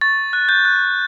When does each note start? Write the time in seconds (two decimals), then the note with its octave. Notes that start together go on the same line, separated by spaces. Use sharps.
0.01 C#6 A6
0.33 F#6
0.49 G6
0.65 F#6